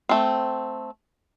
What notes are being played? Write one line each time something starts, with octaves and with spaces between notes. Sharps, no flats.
A3 C4